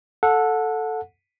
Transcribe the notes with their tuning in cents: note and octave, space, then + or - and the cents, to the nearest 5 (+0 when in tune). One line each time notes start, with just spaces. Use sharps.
A4 +0 F#5 -25